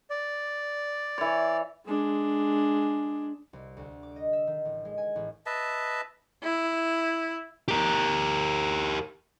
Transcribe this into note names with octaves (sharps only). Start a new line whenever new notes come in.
D5
E3 C#5
G#3 D4
C2
D2
D6
D#5
E5
D#3
A1
G#3
G#5
A1
B4 D#5 E5 A5
E4
G4 A#4